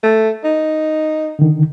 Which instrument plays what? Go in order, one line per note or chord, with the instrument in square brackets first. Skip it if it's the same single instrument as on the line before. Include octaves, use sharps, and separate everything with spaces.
[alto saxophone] A3
D#4
[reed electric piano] D3 D#3